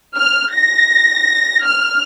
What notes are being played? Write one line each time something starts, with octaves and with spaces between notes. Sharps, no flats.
F6
A#6
F6